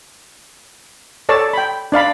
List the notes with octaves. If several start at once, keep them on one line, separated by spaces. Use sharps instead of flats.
A4 C#5 D5 A5
G5 B5
D4 D5 F5 B5